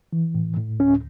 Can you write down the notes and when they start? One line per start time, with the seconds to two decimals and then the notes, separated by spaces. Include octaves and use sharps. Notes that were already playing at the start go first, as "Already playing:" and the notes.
0.13 E3
0.35 A2
0.57 A2
0.79 D2 C#4